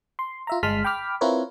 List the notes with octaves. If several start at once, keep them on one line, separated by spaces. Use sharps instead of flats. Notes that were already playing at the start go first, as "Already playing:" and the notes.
C6
F4 E5 A#5
G1 G#3 A5 C6 F6 B6
G5 B5 D6 F6 B6
C4 E4 F4 A#4 B4 C#5